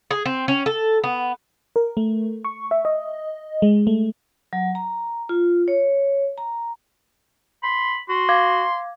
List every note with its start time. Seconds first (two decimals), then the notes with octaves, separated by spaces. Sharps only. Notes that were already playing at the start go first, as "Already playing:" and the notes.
0.11 G#4
0.26 C4
0.48 C#4
0.66 A4
1.04 B3
1.76 A#4
1.97 A3
2.45 C#6
2.71 E5
2.85 D#5
3.62 G#3
3.87 A3
4.53 F#3
4.75 A#5
5.29 F4
5.68 C#5
6.38 A#5
7.63 B5 C6
8.09 F#4 C6
8.29 F5 D6 G#6